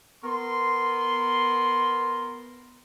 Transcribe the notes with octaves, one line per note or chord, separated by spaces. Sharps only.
B3 A#4 C6